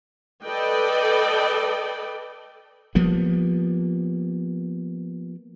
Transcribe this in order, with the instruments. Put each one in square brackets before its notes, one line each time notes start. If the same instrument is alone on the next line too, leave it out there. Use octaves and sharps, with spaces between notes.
[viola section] A4 B4 D5 D#5 G5
[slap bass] F3 G3 A#3 B3